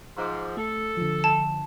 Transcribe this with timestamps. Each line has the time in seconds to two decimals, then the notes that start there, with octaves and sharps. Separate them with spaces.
0.17 G#2 F3 C6 D6
0.57 A3 A4
0.97 D3 F3
1.24 A5